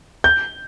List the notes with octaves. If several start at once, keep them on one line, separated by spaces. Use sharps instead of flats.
G6